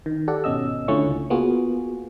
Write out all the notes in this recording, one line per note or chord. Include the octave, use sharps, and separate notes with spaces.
D#3
G4 A4 D5 F#5
G#1 B2 C#4 D#5 E6
D3 A3 C#4 E4 F4 C#6
C#2
A#3 B3 F4 F#4 G#4